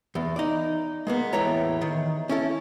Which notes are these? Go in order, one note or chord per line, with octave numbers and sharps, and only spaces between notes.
E2
D#4 D5
G#3 A#3 B3
E2 A2 E3 A3 C#5 A#5
D#3
C#4 E4 A4